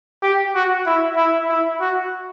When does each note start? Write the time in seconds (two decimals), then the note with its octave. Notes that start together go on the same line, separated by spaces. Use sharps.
0.22 G4
0.55 F#4
0.86 E4
1.17 E4
1.49 E4
1.80 F#4